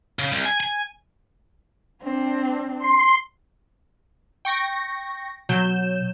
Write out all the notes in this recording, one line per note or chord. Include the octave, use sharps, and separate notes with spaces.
C#3
C2
G#5
G#5
C4 D4
C6
G5 C#6 A#6
B2 F#3 G6 E7